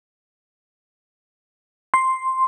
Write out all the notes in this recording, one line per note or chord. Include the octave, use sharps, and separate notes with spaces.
C6